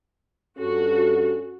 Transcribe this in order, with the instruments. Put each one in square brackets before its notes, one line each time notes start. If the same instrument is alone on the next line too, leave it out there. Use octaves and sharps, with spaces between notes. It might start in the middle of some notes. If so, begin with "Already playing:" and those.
[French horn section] G2 C#4 A4 [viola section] F#4